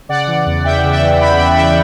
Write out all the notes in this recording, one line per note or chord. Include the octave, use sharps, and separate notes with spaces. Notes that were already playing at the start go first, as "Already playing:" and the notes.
C#3 D5 F#5
E3
E2
E2 E5 G5
C#3
E5 G5
E3
E2 G5 B5
E2 E5 G5
C#3 E5 G5